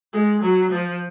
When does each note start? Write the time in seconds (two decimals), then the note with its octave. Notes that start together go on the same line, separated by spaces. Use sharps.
0.13 G#3
0.43 F#3
0.71 F3